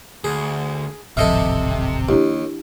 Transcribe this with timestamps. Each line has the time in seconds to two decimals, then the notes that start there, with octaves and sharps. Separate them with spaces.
0.24 D2 G#4
1.17 D1 G#1 C3 F3 A4 D#5 E5 F6
2.09 D#2 D4 E4 G4